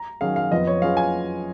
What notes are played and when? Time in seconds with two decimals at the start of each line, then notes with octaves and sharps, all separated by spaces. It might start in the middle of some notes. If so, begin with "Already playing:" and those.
Already playing: A#5
0.21 D#3 F#3 C#4 G#4 F5
0.36 F5
0.51 F2 F3 B3 F4 D#5
0.67 C#5
0.82 F#3 C#4 F4 G#4 B4 F5
0.97 G#5